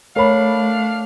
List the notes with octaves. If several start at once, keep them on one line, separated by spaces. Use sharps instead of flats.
A3 D4 A#4 C#5 F5 B5